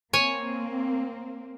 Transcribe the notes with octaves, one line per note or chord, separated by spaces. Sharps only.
A#3 C4 C#5 G#5